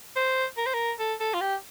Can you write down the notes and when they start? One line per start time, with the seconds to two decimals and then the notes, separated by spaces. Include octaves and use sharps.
0.16 C5
0.57 A#4
0.66 C5
0.74 A#4
0.99 A4
1.20 A4
1.34 F4
1.41 G4